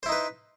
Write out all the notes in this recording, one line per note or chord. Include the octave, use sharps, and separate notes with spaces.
D#4 E4 B4 C5